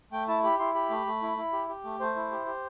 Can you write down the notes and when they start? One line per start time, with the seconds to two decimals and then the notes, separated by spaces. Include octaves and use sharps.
0.12 A3 G5
0.28 E4 A5
0.44 G4 B5
0.59 E4 C6
0.74 G4 B5
0.90 A3
1.06 A3
1.22 E4
1.37 E4
1.52 G4
1.69 G4
1.84 A3
2.00 A3 C5
2.16 E4
2.31 G4
2.46 G4